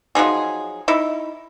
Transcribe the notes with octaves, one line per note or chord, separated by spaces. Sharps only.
F3 F#3 D#4 G#4
D#4 E4